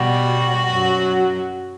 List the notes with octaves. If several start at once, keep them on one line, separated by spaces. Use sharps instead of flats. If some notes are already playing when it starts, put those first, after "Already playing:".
Already playing: B2 G3 F#4
F#2 F#3